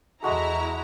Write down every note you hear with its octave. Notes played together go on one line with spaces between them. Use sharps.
E2 G#3 E4 F#4 A4 A#5